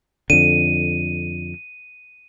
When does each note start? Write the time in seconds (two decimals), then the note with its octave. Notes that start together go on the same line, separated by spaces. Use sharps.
0.30 F2 D3 D#7